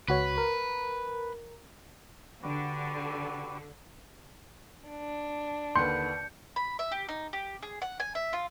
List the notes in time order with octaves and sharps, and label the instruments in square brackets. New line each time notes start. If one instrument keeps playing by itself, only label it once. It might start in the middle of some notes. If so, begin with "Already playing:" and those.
[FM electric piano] C#2 F#4 C#5 [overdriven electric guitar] B4
[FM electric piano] A#4
[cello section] D3 [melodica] F#4 G4 B4
[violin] D4
[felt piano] D#2 D3 B4 [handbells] C6 [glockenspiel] G6 C#7
[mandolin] B5
E5
G4
D#4
G4
G#4
F#5
G#5
E5
F4